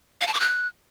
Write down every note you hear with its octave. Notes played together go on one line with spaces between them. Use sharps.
F5
A5
D6
F#6